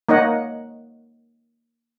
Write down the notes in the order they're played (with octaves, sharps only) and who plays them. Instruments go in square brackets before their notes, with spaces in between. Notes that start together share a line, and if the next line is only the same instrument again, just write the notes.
[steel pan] A#3 D#4 C#5 D#5 F#5